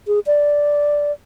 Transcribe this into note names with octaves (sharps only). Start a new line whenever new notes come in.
G#4
D5